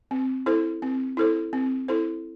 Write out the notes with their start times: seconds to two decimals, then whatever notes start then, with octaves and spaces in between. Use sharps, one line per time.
0.11 C4
0.46 E4 A4 C5
0.82 C4
1.17 E4 A4 C5
1.53 C4
1.88 E4 A4 C5